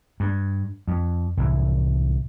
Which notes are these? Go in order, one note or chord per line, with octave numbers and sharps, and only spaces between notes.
G2
F2
C2 A2 E3